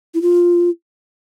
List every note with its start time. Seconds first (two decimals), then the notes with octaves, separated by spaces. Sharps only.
0.14 E4
0.22 F4